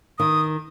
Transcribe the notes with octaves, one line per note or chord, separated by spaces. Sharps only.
D#3 D#6